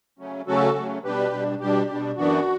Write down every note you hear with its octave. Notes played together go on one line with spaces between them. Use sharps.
C#3 F#3 A3 C#4
C#3 F#3 A3 C#4 F#4 A4
C#3 F#3 A3 C#4
B2 G3 D4 G4 B4
B2 G3 D4
B2 G3 D4 G4
B2 G3 D4
F#2 E3 B3 D4 F#4